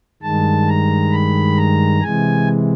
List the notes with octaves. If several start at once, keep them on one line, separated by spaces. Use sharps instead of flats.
G2 D#3 G#3 A5
A#5
B5
A#5
C3 E3 G#3 G#5